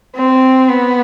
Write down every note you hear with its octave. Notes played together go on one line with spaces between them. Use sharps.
C4
B3